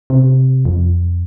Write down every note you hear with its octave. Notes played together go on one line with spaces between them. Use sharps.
C3
F2